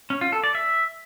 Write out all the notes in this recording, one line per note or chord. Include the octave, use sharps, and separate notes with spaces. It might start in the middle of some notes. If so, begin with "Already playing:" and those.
C#4
F4
A4
D5
E5